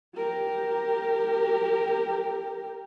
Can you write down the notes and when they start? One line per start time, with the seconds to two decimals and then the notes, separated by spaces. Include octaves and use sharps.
0.15 G4 A#4